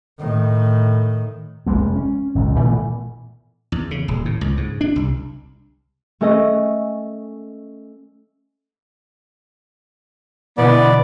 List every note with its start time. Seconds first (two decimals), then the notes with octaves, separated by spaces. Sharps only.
0.20 A2 D#3
1.66 F1 F#2 G#3 A#3
1.95 C#4
2.35 G#1 C#2 A#2 C#3
2.60 A#2 E3 A3 B3
3.72 E2
3.91 C#3
4.08 D#1
4.25 A2
4.41 C#2
4.57 G#2
4.81 D4
4.96 C2
6.21 A3 C#4 A4 D#5
10.58 B2 D3 E3 B3 D5